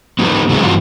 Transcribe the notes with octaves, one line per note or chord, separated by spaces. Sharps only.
B3 D#4 F#4 G4 B4
D3 F#3 G#3 A#3 B3 D#4
G2 E3 F4 F#4